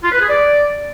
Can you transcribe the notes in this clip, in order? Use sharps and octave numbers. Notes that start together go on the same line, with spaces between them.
F4
B4
G#4
D5